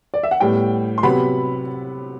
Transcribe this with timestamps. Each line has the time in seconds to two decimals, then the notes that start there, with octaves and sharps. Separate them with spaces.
0.14 D5
0.23 E5
0.31 F#5
0.40 A2 G3 B3 G5
0.98 C6
1.03 C3 F#3 B3 B5